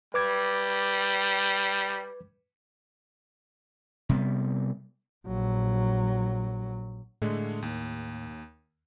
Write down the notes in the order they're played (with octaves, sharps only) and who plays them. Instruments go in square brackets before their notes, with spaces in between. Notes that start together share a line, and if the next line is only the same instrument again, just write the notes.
[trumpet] G3 [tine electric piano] B4 D6 G#6
[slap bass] C3 G3 B3
[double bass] A#1 F#3
[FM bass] A2 [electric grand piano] D3 G#3 A3
[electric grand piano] D#2